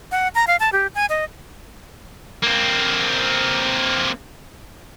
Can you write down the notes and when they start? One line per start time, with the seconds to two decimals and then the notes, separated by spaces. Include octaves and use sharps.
0.11 F#5
0.35 A#5
0.47 F5
0.60 A5
0.73 G4
0.95 G#5
1.10 D#5
2.43 A#3 C4